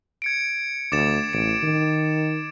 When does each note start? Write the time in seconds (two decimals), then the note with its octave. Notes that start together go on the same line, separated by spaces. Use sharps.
0.22 G#6 C#7 D7
0.92 D2 D6 A6 E7
1.33 A1 D7
1.63 D#3